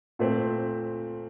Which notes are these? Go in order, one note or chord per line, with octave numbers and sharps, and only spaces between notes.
A#2 A3 C4